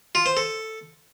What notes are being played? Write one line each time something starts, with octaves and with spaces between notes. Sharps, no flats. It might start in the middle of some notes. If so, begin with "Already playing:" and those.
F4
C5
A4